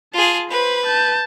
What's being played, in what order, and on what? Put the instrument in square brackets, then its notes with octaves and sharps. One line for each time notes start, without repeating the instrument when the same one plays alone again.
[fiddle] F4 G#4 [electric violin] A5
[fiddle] B4 [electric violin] C5 B5
[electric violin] A5 G6